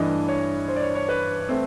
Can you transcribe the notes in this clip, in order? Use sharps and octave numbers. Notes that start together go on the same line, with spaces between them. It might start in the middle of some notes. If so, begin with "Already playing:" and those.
Already playing: G2 E3 A3 D4 D#5
C#5
C5
D5
C#5
C#5
B4
A3 C4